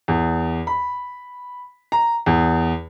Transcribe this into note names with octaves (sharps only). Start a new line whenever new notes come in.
E2
B5
A#5
E2